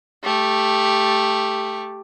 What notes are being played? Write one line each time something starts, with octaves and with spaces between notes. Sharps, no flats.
A3 G4